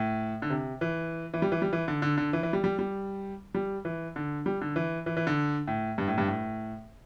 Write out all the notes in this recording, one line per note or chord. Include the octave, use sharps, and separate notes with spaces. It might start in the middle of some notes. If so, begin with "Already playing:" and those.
Already playing: A2
D3
C3
E3
E3
G3
E3
G3
E3
D3
D3
D3
E3
E3
G3
G3
G3
G3
E3
D3
G3
D3
E3
E3
E3
D3
A2
G2
A2
G2
A2